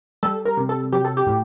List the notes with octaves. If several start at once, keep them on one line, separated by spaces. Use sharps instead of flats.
G3 A4
A#4
C3
A4
F#3 G4
A4
G4
A2